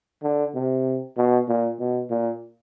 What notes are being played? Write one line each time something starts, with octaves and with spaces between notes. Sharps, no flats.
D3
C3
B2
A#2
B2
A#2